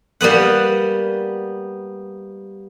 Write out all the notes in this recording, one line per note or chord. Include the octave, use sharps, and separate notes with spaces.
G3 A#3 B3 F#5